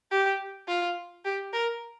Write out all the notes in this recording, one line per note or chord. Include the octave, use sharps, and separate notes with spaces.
G4
F4
G4
A#4